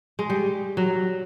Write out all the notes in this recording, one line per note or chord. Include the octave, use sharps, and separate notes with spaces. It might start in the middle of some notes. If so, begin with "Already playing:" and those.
G#3
G3
F#3